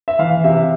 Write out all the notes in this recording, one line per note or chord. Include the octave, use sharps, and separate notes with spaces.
E5
E3 F5
C3 E5